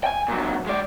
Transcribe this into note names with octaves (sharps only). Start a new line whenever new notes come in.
G5 G#5
A#2 F#3
G#3 D5